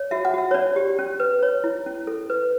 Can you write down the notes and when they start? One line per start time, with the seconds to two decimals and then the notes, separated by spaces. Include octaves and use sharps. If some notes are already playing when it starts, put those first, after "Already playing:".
Already playing: C#5
0.11 F#4 E5
0.25 F#5
0.34 F#4 E5
0.51 C#5
0.54 C#4 D5
0.76 G4
0.99 C#4
1.20 B4
1.43 C#5
1.64 E4
1.86 C#4
2.07 A4
2.30 B4